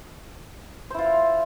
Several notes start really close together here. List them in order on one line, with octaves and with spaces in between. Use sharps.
C5 E4 F4